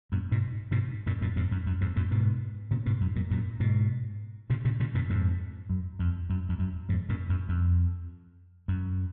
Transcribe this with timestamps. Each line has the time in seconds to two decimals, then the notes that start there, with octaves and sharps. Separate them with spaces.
0.12 F#2 A#2
0.31 G#2 B2
0.71 G#2 B2
1.06 F#2 A#2
1.21 F#2 A#2
1.36 F2 G#2
1.51 F#2
1.66 F#2
1.81 F2 G#2
1.96 F#2 A#2
2.11 G#2 B2
2.71 A#2 C#3
2.86 G#2 B2
3.01 F#2
3.16 F#2 A#2
3.31 F#2 A#2
3.60 G#2 B2
4.50 A#2 C#3
4.65 A#2 C#3
4.80 A#2 C#3
4.95 F#2 A#2
5.10 F2 G#2
5.69 F#2
5.99 F2
6.30 F#2
6.49 F2
6.59 F#2
6.89 F2 G#2
7.09 F#2 A#2
7.29 F#2
7.49 F2
8.68 F#2